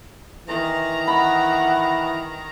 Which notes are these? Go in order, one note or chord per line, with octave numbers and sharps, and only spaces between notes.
D#3 E3 A#5
F#5 B5